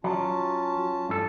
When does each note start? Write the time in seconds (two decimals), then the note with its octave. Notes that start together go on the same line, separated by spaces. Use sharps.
0.04 F#3 C#4 F4 A5
1.09 G2 A4